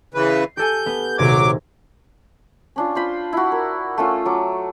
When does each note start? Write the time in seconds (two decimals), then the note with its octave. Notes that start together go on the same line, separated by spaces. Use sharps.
0.14 C#3 E3 B4
0.30 C7
0.57 G4 A4 G#5 G6
0.86 B3
1.18 D#1 C3 F#3 D6 G#6
2.76 C#4 D4 F4
2.95 F4 C5 B5 C6
3.33 E4 F#4
3.52 A#4
3.98 A3 C#4 F4
4.25 F#3 D6